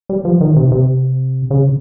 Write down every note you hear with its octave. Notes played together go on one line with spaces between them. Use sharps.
G3
F3
D#3
C3
C3
C#3